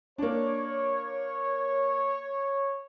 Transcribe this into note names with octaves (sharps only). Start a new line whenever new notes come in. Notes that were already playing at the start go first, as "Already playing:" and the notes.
A#3 D4 C#5